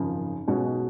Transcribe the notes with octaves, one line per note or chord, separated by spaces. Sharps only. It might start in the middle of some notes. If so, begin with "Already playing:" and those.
Already playing: G#1 F#2 C#3 F3
B1 B2 G#3 C#4 F#4